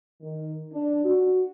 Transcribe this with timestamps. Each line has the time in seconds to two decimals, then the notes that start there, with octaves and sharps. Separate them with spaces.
0.22 D#3
0.73 D4
1.05 F#4